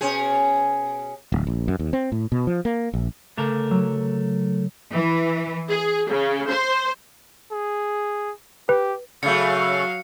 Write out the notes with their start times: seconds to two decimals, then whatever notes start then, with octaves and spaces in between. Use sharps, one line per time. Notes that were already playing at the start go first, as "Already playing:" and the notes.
0.01 B2 C#4 G#4
1.32 D1
1.47 A#1
1.68 F#2
1.79 D#2
1.93 C4
2.12 A2
2.32 B2
2.47 F3
2.65 A#3
2.94 A#1
3.38 C#3 A3 A#4 A5 D6
3.71 F#3 E6
4.92 E3
5.69 G#4
6.09 C#3
6.50 C5
7.52 G#4
8.69 G4 B4
9.23 C#3 F#3 A3 F5 C#7